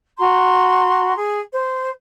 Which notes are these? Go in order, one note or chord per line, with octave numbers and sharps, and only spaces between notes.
F#4 A#5 C6
G#4
C5